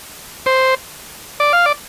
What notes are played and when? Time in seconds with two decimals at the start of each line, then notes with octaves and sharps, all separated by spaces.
0.46 C5
1.40 D5
1.53 F5
1.66 D5